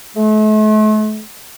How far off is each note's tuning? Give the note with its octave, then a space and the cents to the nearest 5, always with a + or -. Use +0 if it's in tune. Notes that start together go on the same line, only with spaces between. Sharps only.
A3 -40